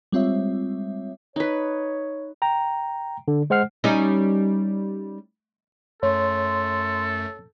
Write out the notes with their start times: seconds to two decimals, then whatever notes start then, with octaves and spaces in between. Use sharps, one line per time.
0.12 G3 G#3 C4 F4 C#5 E5
1.36 D#4 B4 C#5
2.42 G5 A#5
3.28 D3
3.50 G#3 C5 F#5 F6 C7
3.84 G3 C#4 D#4
6.03 F#2 A3 A4 C#5 C6